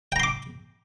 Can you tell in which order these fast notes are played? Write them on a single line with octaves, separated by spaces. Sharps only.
G5 A#5 C6 D6